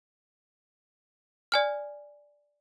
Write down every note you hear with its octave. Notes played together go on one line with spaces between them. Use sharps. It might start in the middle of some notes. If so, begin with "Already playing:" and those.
D5 G#5 F6